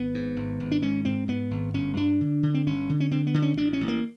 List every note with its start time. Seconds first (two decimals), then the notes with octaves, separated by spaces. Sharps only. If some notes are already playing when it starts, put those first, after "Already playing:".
Already playing: G#1 B3
0.14 G#2
0.36 G#1
0.60 G#1
0.72 D4
0.82 G#2 C#4
1.05 G#2 C4
1.28 G#2 B3
1.51 G#1
1.74 G1 C#4
1.97 G2 D4
2.21 D3
2.43 D3
2.54 C4
2.66 G1 C#4
2.89 D3
3.00 C#4
3.11 D3 C4
3.27 B3
3.34 D3
3.42 C#4
3.57 A1 D4
3.73 C#4
3.81 A1
3.88 A#3